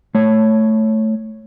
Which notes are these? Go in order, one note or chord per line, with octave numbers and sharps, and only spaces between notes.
A3 C#5